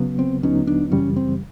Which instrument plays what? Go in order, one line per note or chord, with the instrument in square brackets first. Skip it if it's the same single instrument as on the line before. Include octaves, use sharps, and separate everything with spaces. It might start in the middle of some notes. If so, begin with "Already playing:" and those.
Already playing: [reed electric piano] C#3 F#3 B3
[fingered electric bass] C4
[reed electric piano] D#2 D3 F#3 B3 D#4 [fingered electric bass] C#4
[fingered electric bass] D4
[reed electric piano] F#2 C#3 E3 G3 [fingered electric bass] C#4
[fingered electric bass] C4